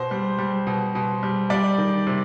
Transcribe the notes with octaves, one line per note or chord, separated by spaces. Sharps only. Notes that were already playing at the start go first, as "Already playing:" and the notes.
Already playing: B2 C5
G3
G3
B2
B2
G3
G3 D5
D#3
C3